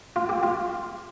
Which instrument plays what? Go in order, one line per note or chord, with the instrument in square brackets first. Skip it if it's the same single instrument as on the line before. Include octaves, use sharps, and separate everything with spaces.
[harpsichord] F4
G4
F4